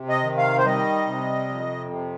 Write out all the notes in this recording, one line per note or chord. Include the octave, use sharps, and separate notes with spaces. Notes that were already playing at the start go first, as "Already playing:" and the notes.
Already playing: C3
D#5
D#3
F5
C5
G3 D#5
C3
F2
C3